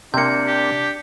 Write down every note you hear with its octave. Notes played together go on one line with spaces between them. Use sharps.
C3 A#3 D4 G6 C#7
G4